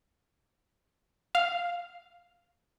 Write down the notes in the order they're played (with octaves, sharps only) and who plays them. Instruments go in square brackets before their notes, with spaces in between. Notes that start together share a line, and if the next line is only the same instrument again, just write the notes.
[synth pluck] F5